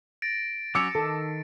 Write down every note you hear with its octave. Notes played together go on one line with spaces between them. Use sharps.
A6 A#6 D7
F#3 C#4 C#5 D6 E6 C#7
D#3 A4